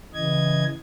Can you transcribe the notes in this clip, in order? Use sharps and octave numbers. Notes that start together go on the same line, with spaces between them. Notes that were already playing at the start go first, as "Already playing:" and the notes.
C#3 E3 D#5 G#6